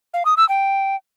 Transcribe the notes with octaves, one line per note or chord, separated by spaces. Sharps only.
F5
D#6
E6
G5